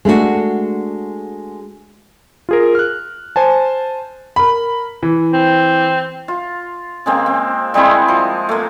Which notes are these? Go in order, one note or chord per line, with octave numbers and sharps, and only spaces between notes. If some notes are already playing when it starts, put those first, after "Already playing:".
G#3 A3 D4 F#4
F4 G#4 A#4
F6 F#6
C5 G#5 A5
A#4 B5
E3
C4
F4
C#3 G#3 A#3 C4
C4
G3 G#3 C4 E4
F3
A3 A#3